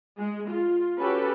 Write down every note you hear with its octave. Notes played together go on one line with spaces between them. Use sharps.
G#3
F4
C#4 F#4 G4 A4 B4